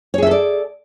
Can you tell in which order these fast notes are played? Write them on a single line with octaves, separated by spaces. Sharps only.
C#5 G#4 E5 A4 D5